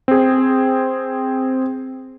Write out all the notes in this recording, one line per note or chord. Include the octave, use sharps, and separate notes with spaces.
C4 G#4